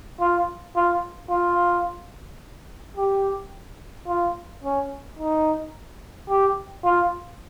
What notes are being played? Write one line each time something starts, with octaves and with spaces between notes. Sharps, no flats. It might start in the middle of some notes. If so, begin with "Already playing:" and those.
F4
F4
F4
G4
F4
C#4
D#4
G4
F4